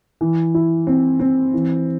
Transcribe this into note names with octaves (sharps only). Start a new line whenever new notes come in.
E3
E4
C4
C4
E3